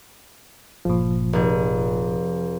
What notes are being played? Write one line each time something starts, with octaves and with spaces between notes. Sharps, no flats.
G1 A#2 F3
F1 G#4